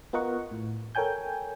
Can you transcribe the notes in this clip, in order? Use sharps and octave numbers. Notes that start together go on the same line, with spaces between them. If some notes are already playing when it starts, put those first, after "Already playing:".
B3 F4 A#4 D#5 F#5 C#6
A2
A4 A#4 C#5 G5 G#5 G6